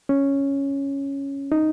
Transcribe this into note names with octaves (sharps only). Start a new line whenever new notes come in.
C#4
D#4